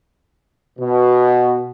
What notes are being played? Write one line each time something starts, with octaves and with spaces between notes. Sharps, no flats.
B2